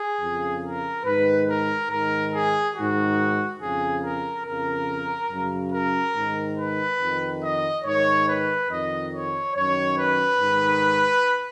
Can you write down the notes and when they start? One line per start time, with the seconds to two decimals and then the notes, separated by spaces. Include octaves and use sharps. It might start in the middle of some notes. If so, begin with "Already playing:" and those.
Already playing: G#4
0.20 F2 C#3
0.62 A#4
1.04 G#2 D#3 B4
1.47 A#4
1.90 G#2 D#3 A#4
2.32 G#4
2.74 G#2 D#3 F#4
3.59 F2 C#3 G#4
4.02 A#4
4.44 F2 C#3 A#4
5.30 F#2 C#3
5.72 A#4
6.15 G#2 D#3
6.57 B4
6.99 F2 D#3
7.42 D#5
7.84 G#2 D#3 C#5
8.26 B4
8.69 F2 D#3 D#5
9.11 C#5
9.54 F#2 D#3 C#5
9.97 B4
10.39 G#2 D#3